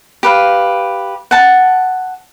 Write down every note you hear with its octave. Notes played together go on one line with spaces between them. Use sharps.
G4 B4 F5
F#5 A5